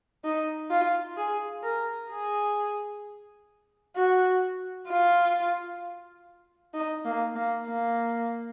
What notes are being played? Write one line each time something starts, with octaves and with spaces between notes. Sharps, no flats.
D#4
F4
G#4
A#4
G#4
F#4
F4
D#4
A#3
A#3
A#3